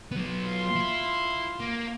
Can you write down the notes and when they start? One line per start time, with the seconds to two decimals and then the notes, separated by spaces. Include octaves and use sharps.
0.11 F#3 B3
0.46 F4 C6
0.75 E4
1.60 A#3